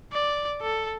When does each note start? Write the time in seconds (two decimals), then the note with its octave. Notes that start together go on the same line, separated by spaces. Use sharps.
0.13 D5
0.62 A4